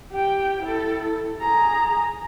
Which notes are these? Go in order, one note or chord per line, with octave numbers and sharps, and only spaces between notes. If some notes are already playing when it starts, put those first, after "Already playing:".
G4 G5
E4 A4
G#4 A#5